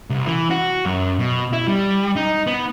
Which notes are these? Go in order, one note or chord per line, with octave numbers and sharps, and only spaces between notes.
C2
E3
F#4
F#2
B2
E4
G3
D#4
B3